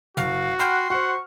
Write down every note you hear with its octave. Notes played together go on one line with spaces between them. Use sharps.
F#1 F#4 F5
F#5 G5 B5 C6 F6
F#4 C5 F#5 C#6